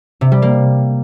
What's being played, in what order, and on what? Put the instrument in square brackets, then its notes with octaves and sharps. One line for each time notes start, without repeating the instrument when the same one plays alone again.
[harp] C3
G3
A#3